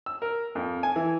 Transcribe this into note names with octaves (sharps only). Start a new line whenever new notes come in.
E6
A#4
F2
G#5
E3